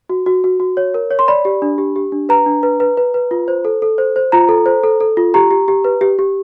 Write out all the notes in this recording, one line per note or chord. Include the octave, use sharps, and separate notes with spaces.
F#4
F#4
F#4
F#4
C#5
A#4
C#5
C6
D5 B5
G4
D4
G4
G4
D4
B4 A#5
D4
B4
B4
B4
B4
F4
C5
A4
A4
C5
C5
F4 A#5
A4
C5
A4
A4
F4
G4 A#5
G4
G4
B4
G4
G4